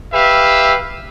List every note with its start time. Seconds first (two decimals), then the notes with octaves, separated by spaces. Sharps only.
0.13 G4 B4 E5 F5